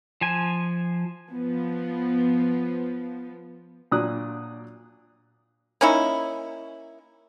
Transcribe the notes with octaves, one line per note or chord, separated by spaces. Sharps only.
F3 G#5
F3 B3
A#2 F#3 D4 D#6 F#6
A#3 C#4 D#4 E4